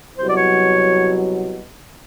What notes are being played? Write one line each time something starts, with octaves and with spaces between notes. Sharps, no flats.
C2 B2 F#3 C5
D5
C#5